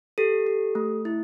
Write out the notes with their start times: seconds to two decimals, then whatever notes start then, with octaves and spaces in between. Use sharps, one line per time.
0.18 G4 A4
0.47 G4
0.75 A3
1.05 E4